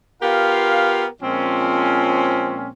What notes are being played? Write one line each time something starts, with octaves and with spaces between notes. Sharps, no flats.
B3 F4 G4 A#4 F5
A#2 F3 G#3 C4 C#4